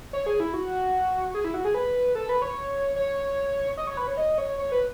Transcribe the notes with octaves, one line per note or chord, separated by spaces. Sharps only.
C#5
G#4
E4
F#4
G#4
E4
F#4
G#4
B4
A4
B4
C#5
C#5
D#5
C#5
B4
C#5
D#5
C#5
C#5
B4